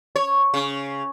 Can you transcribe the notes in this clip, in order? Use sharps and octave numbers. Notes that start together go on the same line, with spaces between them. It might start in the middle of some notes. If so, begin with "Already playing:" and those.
C#5
C#3